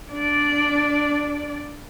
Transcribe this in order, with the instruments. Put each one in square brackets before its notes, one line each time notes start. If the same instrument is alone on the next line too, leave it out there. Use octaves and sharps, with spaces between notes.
[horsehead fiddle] D4 D5